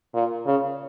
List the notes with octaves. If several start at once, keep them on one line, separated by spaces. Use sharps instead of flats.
A#2
C#3